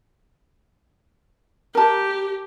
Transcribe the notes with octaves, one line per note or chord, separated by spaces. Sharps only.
G4 A#4 A5